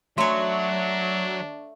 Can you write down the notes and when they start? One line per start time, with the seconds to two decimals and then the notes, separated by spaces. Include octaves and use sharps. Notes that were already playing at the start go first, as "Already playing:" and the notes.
0.18 F#3 A3 D4 C#5 G#5 A#5 C6